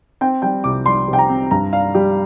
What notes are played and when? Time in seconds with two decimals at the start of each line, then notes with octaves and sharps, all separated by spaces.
0.21 C4 G5
0.42 G3 G5
0.64 C2 D6
0.86 G3 C6
1.08 C3
1.13 G5
1.19 A#5
1.30 C4
1.51 G2 A#5
1.73 D4 F5
1.95 G3 G4